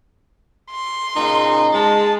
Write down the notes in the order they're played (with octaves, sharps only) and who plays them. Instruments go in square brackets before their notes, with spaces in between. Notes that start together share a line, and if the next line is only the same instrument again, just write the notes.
[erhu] C6
[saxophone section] A#2 C#3 D#4
[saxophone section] G#3 [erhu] A5